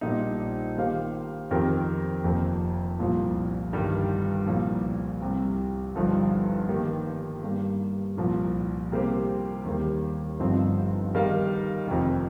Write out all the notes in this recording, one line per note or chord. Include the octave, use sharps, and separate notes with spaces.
A#1 A#2 G3 D#4
D#3 A#3 G4 C5 F5
F2 D#3 C4 G4 A#4
F1 F2 D#3 A#3
C2 A#2 F3
G1 G2 D#3 G3
C2 A#2 F3
C2 C3 G3
G1 G2 F3 D#4
D#3 A#3 G4
G2 G3 A#3
C2 A#2 F3
C3 G3 A#3 G4 C5
D#2 D#3 G3 A#3 G4
G1 G2 F3 C4 D#4
D#3 G3 D#4 A#4 F5
F1 F2 C3 D#3